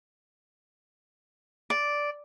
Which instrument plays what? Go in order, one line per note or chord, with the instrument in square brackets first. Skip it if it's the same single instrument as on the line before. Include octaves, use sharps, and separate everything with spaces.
[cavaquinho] D5